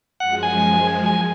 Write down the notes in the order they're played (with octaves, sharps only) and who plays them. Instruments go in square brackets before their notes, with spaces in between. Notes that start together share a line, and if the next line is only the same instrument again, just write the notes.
[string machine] F#2 F3 G#3 [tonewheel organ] F#5
[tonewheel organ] G#5
G#5